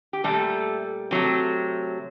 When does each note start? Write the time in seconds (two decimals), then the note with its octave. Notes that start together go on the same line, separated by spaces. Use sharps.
0.13 G4
0.24 A#2 G3 A3 A4
1.11 C3 F#3 A3